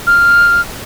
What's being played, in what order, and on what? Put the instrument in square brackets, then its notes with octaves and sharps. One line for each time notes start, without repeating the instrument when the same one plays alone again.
[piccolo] F6